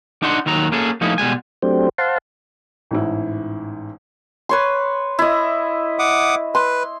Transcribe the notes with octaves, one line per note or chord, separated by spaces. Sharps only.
D4 D#4 F#4 F#5 C6
D#2 D#3 F#3 A#5
A#3 C#4 G#4 A4
F3 A3 A#3 C#4 D#4 E4
B2 G3 G#3 G#5
F#3 A3 C4 D4 G4 C5
C5 F5 F#5 A5 C6
A1 G#2 E4
B4 C#5 C6
E4 D#5
F#5 D6 D#6
B4 C6